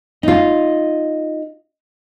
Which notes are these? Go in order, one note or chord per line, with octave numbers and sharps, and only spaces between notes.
D#4 F4 D#5